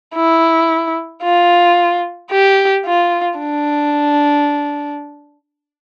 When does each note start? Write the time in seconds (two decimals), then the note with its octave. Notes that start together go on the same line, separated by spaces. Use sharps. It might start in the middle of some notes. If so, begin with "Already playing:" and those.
0.15 E4
1.23 F4
2.31 G4
2.86 F4
3.39 D4